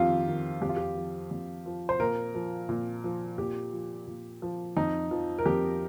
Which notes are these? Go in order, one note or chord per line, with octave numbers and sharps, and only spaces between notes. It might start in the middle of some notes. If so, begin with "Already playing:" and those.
Already playing: F2 D#3 F4 G4
D#3
F2 G4
F4
G4
F3
F2
F3
C5
A#2 A#4
F3
A#2
F3
A#2 G4
F3
A#2
F3
F2 D#4
F3
A#4
F2 G4